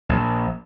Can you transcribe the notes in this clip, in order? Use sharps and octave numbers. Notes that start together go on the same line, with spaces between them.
A#1